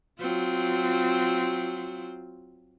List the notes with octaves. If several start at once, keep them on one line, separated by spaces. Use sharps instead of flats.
F#3 C4 F4